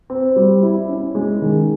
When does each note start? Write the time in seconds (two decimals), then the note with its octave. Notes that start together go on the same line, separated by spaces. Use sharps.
0.10 C4
0.36 G3
0.63 E4
0.89 C#4
1.15 G#3
1.42 D#3